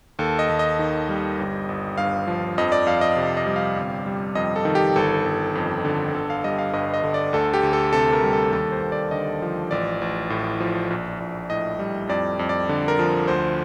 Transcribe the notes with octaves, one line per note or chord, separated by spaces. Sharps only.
D#2 A4
D#5
D#2
D#5
D#3
G3
G1
G1
G2 F5
F3
F2 D#5
D5
F2 F5
D#5
C3
D#5
G3
F5
G1
G3
F2 D#5
A4
D#3
G4
G1 A4
G1
F2
D3
G1 A4
F5
G3 D#5
F5
G2 D#5
D#5
D3
D5
D2 A4
G4
D2
A4
C3 A4
A#4
G3
A4
D#2 A4
C5
D#2
D5
D3 D#5
F3
A1 D5
A1
A2
F3
A#1
A#1
A2 D#5
G3
F2 D5
F2
D5
D3
A#4
F3
D2 C5